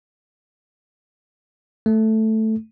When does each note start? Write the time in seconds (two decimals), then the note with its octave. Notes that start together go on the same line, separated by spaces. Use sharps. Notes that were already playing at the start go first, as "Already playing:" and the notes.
1.86 A3